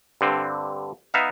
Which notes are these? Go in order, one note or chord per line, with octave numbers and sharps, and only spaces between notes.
G2 D3 C4
B3 D#4 E5 F5